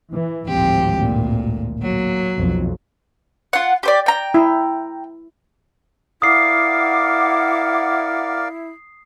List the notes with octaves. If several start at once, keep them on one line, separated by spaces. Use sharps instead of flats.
E3
G#1 D2 A2 F3 C4 G4
A#2
F#3 A#3
B1 F2
F4 F#5
G4 C5 D5
G5 A#5
E4
E4 A#4 D5 F5 F#5 D6 D#6 C7